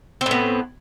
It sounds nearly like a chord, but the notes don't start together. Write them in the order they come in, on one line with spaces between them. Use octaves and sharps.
C4 A2 B3